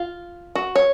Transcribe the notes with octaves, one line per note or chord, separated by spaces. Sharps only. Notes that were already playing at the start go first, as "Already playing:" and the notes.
Already playing: F4
F#4
C#5